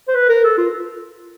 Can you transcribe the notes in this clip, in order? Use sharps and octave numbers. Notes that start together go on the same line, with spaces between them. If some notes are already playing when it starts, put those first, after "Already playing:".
C5
B4
A#4
A4
F4